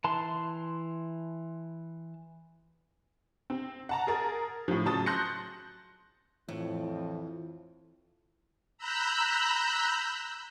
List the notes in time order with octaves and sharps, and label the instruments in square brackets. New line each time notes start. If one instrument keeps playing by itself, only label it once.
[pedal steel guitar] E3 A5 C6
[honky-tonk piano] C4
F#5 A5 A#5
G#4 A#4 A6
A2 F3
C#3 F#3 A5 D#6 A6
C6 F#6 G6 A#6 C#7
[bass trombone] F2 [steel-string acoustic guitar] A2 [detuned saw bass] E3
[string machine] A#5 B5 E6 F#6 G6